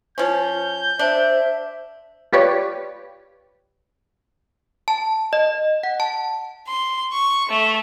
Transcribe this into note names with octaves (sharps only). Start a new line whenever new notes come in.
F3 C#4 G6
D4 C5 E5
F4 G4 B4 C#5 D5
A5
D#5
F#5
A5
C6
C#6
A3